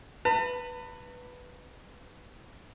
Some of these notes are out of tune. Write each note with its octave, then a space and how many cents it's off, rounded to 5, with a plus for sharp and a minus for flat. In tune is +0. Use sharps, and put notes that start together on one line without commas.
B4 +0 A5 +45